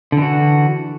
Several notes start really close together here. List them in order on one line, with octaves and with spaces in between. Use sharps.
D3 E3 F#4